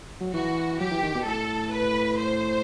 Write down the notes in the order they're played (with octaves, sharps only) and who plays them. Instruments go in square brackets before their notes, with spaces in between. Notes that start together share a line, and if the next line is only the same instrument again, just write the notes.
[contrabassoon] F#3
[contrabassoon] E3 [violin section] F#4
[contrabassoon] F#3 [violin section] G4
[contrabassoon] E3
D#3
B2
[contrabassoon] A2 [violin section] A4
[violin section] B4
C5